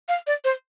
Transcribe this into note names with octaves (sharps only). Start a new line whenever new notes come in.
F5
D5
C5